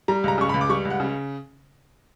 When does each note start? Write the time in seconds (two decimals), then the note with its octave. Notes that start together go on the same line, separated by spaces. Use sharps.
0.08 G3 A#5
0.24 C#2 A#5
0.38 C#3 C#6
0.49 B5
0.54 C#2
0.61 D6
0.70 G3 C#6
0.85 C#2
0.90 F#5
1.00 C#3